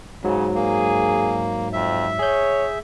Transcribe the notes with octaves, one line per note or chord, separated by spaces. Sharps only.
G#2 C#3 F#3
A#3 G#4
F2 E5
G#4 C#5 G6